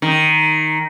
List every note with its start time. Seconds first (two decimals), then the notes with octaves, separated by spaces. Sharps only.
0.02 D#3